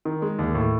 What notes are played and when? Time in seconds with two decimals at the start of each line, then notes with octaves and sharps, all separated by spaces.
0.05 D#3
0.22 G#3
0.39 D#2
0.55 A2